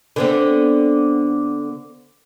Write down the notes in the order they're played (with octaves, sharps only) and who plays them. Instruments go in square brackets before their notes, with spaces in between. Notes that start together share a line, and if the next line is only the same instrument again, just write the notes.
[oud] D3 B3 C4